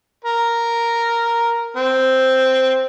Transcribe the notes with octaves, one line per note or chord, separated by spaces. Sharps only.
A#4
C4